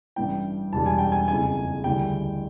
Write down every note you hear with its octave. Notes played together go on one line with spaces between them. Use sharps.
A1 G2 E3 G5
E1 E2 B2 G3 A5
G#5
G5
G#5
F#1 F2 C#3 E3 G#5
D2 C#3 E3 G3 G5